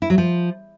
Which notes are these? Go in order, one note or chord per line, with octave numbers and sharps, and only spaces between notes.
E4
F#3
F3